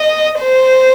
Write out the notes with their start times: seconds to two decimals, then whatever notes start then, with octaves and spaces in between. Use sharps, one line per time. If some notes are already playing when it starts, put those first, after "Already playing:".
Already playing: D#5
0.40 C5